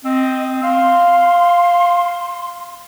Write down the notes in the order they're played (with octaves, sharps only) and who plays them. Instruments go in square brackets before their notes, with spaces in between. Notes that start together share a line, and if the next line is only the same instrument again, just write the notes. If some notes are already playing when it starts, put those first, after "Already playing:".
[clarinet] C4 [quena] D#5
[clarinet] F5 [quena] C6